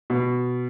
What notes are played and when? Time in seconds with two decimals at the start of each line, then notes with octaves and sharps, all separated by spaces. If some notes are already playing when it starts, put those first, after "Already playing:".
0.10 B2